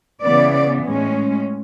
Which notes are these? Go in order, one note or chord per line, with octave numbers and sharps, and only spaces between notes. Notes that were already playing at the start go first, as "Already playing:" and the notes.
C#3 E3 B3 D5
A2 G#3 C#4